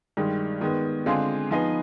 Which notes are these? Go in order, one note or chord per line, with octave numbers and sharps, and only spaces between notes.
G2 D#3 G#3
D#3 G#3 B3
D3 G#3 C4 F4 G#4
F3 B3 D#4 G#4 B4